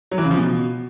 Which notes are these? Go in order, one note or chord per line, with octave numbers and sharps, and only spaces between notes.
F#3
E3
C#3
F3
B2